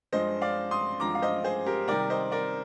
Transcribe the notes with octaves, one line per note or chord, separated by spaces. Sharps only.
G2 F3 G#3 C5 D#5
D5 F5
C6 D#6
G2 F3 G#3 A#5 D6
F5
C5 D#5
G#4 C5
G4 A#4
C3 D#3 G3 A#4 D5
C5 D#5
A#4 D5